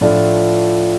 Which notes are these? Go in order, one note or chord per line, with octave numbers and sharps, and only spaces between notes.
A2 F3 A3 D4 F4